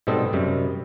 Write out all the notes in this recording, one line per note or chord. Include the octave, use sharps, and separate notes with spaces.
G#2 B2 G3 C4 A4 D#5
F#2 C3 G3